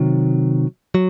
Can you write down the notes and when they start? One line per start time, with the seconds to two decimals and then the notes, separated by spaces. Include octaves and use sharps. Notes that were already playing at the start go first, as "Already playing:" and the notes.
Already playing: C3 D#3 F#3
0.95 F#3